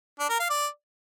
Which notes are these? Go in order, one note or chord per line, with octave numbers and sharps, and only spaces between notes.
D4
A#4
F5
D5